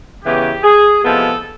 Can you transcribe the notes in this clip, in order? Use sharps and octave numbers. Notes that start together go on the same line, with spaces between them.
C#3 E3 G#3 B3 G4
G#4
C3 F3 G#3 B3 E4 A4